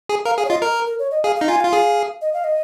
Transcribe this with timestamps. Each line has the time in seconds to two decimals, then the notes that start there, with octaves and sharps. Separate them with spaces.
0.09 G#4
0.25 A#4 F5
0.38 G#4 F5
0.45 C#5
0.50 F4 D#5
0.62 A#4
0.87 A#4
0.99 C#5
1.11 D#5
1.24 G#4 F5
1.36 F5
1.41 D#4
1.48 F4 G#5
1.60 F5
1.64 F4
1.72 G#4 F5
2.22 D#5
2.33 F5
2.44 D#5